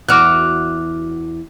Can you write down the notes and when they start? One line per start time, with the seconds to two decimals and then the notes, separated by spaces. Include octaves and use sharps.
0.08 E2 F#4 D6 F6 F#6